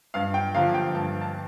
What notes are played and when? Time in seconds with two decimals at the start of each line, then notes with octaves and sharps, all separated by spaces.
0.14 G2 F5
0.34 G5
0.54 D3 F3 A#3 F5
0.74 G5
0.94 G2 A5
1.21 A5